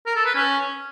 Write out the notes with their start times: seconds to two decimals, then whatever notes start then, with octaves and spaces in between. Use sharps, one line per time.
0.06 A#4
0.16 A4
0.25 B4
0.35 C#4